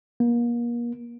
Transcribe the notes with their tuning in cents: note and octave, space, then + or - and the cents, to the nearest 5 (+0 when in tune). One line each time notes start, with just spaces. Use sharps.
A#3 +35